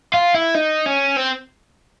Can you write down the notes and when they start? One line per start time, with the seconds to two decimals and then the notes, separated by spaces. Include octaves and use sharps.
0.14 F4
0.34 E4
0.55 D#4
0.86 C#4
1.16 C4